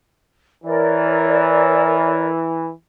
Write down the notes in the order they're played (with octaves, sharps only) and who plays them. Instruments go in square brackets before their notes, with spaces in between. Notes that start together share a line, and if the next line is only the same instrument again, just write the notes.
[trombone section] E3 [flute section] A#4 C#5 D5